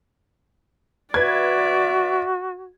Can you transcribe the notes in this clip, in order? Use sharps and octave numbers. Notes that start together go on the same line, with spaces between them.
F#4 B4 D5 E5 G#6